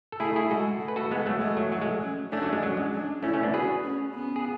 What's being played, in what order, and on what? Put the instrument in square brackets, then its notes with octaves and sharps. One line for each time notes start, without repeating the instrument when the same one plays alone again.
[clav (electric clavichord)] A4
[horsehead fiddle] A3 [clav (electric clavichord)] E4 G#4
[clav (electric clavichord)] E4 G#4
[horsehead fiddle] G#3 [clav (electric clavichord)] F#4 A4
[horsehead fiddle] A3
[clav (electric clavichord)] B4
F#4 A4
[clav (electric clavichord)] G#3 B3 [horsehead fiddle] A3
[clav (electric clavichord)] F#3 A3
[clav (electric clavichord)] G#3 [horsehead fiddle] A3
[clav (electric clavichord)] F#3
[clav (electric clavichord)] F#3 [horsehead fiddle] A3
[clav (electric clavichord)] G#3
[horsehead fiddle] C#4
[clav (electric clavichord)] A3 C#4 [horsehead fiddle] D4
[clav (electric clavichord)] F#3 A3
G#3
[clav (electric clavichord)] F#3 [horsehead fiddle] C#4
[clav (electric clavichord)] G#3
[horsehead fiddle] D4
[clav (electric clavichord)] A3 C#4 [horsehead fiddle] E4
[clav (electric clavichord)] A3 C#4
B3 D4
[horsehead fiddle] F#4 [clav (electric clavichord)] G#4 B4
[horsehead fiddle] C#4
B3
[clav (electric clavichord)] G#4